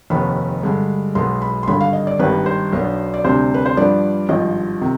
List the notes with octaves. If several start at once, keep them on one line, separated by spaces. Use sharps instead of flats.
F1 D#2 D#3 B3 B5
G2 D3 G#3
B1 B2 G#3 B3 C6
B5
C6
G#1 G2 D3 B5
F5
D#5
D5
G#1 G2 D#3 G3 B4
C5
B1 B2 B3 D4
D5
D2 C3 G3 D4 C5
B4
C5
G2 F3 B3 D4 D5
G#1 G2 F3 D#5
C3 D#3